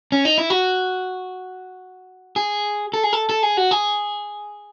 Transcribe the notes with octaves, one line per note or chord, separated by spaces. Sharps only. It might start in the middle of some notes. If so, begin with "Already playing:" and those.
C#4
D#4
E4
F#4
G#4
A4
G#4
A4
A4
G#4
F#4
G#4